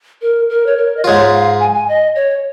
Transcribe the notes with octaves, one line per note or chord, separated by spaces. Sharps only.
A#4
A#4
C#5
A#4
D#5
G#2 G#3 F4 C#5
F5
G#5
G#5
D#5
C#5